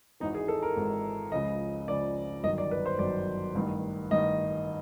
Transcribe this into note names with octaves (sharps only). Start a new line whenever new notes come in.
G#1 G#2 E3 D#4
G#4
A4
A#4
G#1 G#2 E3
C#2 C#3 F3 D#5
C#2 C#3 F3 D5
G1 F#2 D#3 F#3 D#5
D5
B4
C5
G1 F#2 D#3 F#3 D5
A1 G2 D#3
A1 G2 D#3 D#5